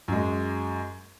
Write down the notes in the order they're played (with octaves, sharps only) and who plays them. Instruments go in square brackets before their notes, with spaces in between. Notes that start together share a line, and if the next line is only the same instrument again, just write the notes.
[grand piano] F#2 G#3